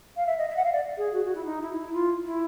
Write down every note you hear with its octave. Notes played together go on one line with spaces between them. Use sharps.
F5
E5
D#5
E5
F#5
F5
D5
G#4
F#4
F#4
E4
D#4
E4
E4
F4
E4